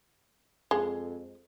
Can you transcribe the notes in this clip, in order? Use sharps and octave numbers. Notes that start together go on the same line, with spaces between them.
F2 G#3